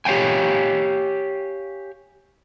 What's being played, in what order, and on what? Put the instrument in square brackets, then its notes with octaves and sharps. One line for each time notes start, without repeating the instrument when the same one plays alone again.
[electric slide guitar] G4 C#5 D5 F5 G5 G#5